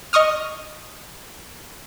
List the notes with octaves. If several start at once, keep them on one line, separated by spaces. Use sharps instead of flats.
D#5 C#6 D#6 F6